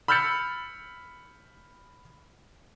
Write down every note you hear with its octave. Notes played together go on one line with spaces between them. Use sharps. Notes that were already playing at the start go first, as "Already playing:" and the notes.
B5 E6 F6 G6 A6 C#7